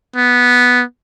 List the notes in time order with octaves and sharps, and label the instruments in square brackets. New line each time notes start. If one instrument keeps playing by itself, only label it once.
[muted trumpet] B3